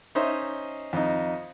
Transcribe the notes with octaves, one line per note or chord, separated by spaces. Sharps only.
C#4 D#4 C5 D#5 E5
F2 D#4